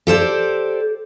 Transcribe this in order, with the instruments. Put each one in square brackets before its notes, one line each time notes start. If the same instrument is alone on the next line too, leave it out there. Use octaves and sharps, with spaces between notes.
[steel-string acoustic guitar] G4 A4 C5 D5